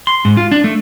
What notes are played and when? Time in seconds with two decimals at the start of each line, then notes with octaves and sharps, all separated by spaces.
0.07 C6
0.25 G#2
0.37 F4
0.52 D4
0.64 A3